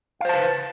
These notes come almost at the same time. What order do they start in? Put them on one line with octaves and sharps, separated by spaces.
F5 C5 A5 B4